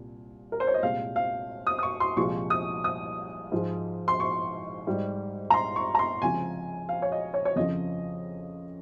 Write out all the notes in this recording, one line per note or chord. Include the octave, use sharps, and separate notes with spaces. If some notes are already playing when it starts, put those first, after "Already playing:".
Already playing: C2 A#2
A#4
C5
C#5
D#5
C2 A#2 G#3 F5
F5
D#6
D#6
C#6
C6
C2 A#2 F3 G#3 C#6
D#6
D#6
G#2 F3 G#3
C6
C#6
G#2 G3
A#5
C6
C#6
A#5
C6
C#2 C3 F3 G#5
F5
C#5
D#5
C#5
C#5
F2 C#3 F3 D#5